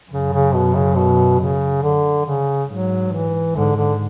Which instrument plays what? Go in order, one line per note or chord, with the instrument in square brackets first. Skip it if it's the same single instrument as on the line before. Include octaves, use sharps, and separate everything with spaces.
[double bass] F#2 [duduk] C#3
[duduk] C#3
B2
C#3
B2
C#3
D3
C#3
[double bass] G#2 [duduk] F#3
[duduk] E3
[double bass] G#2 [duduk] D3
[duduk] D3